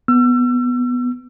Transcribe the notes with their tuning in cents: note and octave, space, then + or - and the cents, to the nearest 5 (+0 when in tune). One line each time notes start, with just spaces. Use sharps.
B3 +0 E6 +35